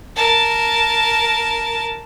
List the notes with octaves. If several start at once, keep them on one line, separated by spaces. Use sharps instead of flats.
A#4 A5